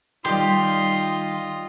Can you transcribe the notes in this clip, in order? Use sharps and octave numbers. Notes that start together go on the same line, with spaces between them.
D#3 G3 F4 G4 D#5 C6